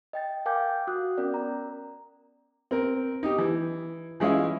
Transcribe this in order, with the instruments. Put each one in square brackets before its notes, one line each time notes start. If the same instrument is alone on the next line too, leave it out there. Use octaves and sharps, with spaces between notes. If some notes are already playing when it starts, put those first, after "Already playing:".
[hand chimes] D#5 G5 A6
A#4 F5 G5 G#5 D6 G6
F#4 D#6 F#6
B3 C#4 A#4 D5
A#4 A#5
[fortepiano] C4 A#4
D#4 G4
E3
E3 G#3 C#4 E4 F4